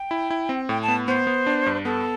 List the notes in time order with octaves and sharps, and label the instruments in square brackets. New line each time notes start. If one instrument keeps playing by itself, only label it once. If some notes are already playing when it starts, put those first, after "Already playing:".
Already playing: [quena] G5
[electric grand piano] E4
E4
C4
[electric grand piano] A2 [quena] G5
[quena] A5
[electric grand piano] B3
[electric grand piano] B3 [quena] C5
[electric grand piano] B3
D4
G2
[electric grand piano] B3 [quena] A4